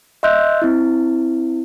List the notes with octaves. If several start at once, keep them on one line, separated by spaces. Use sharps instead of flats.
D#5 E5 C6 E6 F#6 G6
C4 E4